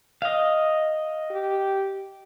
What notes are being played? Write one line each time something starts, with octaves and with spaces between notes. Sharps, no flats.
D#5 F5
G4